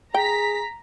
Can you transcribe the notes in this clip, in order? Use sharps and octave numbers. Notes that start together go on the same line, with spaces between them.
G#4 G5 A#5 B6